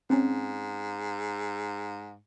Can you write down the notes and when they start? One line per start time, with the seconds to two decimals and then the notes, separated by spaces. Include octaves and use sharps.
0.10 G#2 C4 C#4